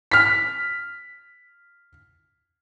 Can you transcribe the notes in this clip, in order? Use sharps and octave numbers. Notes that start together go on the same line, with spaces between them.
F6 B6